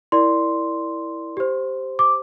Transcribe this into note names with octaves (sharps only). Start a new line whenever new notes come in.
E4 A#4 D5 C6
G4 C5
D6